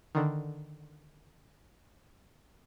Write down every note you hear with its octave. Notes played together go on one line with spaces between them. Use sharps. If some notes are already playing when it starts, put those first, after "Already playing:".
D3 D#3